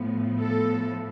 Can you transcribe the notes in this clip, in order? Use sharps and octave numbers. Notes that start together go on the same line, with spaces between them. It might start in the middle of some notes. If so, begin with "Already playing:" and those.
Already playing: A2 F3 B3
A4